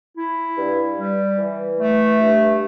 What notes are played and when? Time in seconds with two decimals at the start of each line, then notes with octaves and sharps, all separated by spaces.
0.17 E4
0.58 G2
0.98 G3
1.38 E3
1.80 A3
2.20 G2